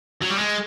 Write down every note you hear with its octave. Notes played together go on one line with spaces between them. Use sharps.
F#3
G3
G#3